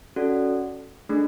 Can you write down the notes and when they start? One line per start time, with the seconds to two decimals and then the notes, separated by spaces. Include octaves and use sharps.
0.16 C#4 F#4 A4 D5
1.09 A3 D4 G#4